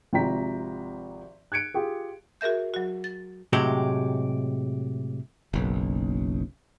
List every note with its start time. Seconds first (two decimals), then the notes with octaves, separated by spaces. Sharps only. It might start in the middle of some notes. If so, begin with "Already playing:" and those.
0.13 G#1 C3 F3 G5 A#5 B6
1.52 F#6 G#6 C#7 D7
1.74 F4 G4 G#4
2.41 F#4 G#4 A#4 E5 G6
2.74 F#3 F#4
3.04 A6
3.53 A2 C3 F#3 G#3 G4
5.54 F#1 B1